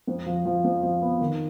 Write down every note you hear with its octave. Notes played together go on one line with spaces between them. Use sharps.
F2
F3
F3
F2
F3
B3
D#3